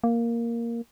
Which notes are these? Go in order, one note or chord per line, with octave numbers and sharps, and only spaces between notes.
A#3